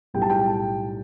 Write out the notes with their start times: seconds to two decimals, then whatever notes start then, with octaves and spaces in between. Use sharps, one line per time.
0.14 B1 A2 G3 G5
0.22 A5
0.30 G5